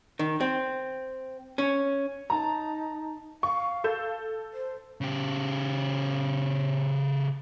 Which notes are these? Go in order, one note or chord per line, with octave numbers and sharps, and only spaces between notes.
D#3
C4
C#4
D#4 A5 A#5
F5 C#6
A4 G6 E7
C5
C#3 G4